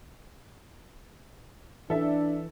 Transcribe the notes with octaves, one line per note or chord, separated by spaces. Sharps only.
E3 D4 A4 E5